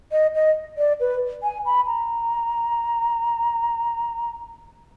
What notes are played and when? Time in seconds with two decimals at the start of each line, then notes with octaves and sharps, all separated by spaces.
0.12 D#5
0.35 D#5
0.78 D5
1.00 B4
1.43 G#5
1.66 B5
1.87 A#5